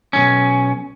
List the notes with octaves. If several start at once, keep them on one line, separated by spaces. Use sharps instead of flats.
B1 F#2 C#4